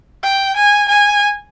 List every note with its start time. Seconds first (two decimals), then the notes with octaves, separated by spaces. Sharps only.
0.23 G5
0.56 G#5
0.88 G#5